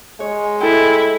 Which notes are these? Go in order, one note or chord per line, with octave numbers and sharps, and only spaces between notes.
G#3 C#5
E4 A4 G5